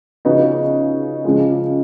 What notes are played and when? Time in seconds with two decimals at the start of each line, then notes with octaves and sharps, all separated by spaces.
0.25 C#3 F3 B3 D#4 F#4
1.25 C#3 F3 G#3